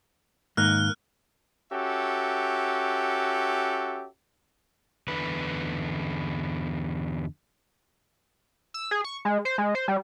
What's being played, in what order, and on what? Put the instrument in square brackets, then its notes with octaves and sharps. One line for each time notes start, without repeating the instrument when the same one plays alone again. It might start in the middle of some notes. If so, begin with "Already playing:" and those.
[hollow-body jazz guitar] G#2 D#3 A#3 [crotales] F6 F#6
[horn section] C#4 F#4 G4 A4 E5
[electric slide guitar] E2 D3 B4
[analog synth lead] E6
G#4
C#6
G#3
C5
G#3
C5
G3